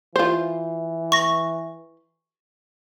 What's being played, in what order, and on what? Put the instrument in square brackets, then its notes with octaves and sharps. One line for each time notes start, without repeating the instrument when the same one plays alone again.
[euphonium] E3 [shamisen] F4 C5
[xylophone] C#6 A#6